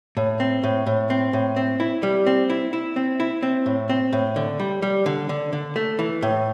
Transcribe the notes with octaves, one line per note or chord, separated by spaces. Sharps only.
A2
C4
A2
A2
C4
A2
C4
E4
G3
C4
E4
E4
C4
E4
C4
A2
C4
A2
D3
G3
G3
D3
D3
D3
A3
E3
A2